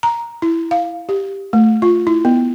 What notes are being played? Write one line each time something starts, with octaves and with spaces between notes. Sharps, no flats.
A#5
E4
F5
G4
A3
F4
E4
B3